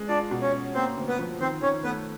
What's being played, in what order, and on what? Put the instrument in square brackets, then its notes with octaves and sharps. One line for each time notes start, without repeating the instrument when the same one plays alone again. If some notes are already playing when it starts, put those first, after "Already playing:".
Already playing: [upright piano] G#3
[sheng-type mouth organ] D4 D5 [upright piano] F4
[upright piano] B2
[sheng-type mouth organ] C#4 C#5
[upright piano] C#4
[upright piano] A#3 [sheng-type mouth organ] C4 C5
[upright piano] D2
[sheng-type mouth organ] B3 B4
[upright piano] F3
[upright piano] D#3 [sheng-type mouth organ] C4 C5
[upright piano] D#3 [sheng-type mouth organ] C#4 C#5
[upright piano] A3 [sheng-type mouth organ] B3 B4